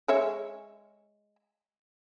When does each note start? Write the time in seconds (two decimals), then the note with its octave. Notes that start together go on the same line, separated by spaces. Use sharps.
0.08 G#3 C#5 E5